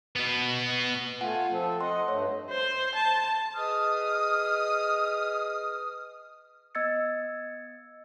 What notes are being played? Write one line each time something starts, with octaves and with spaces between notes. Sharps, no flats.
B2 B3
A3 F4 F#5 G#5
F3 C4 A4
D#5 F#5 C6
G2 A3 C#5
C5
A5
G#4 B4 D#5 D#6 F6
B3 D#5 E6 G#6 A6 C#7